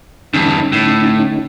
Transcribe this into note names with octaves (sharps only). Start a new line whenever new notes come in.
E2 G2 D3 C#4 D#4
A2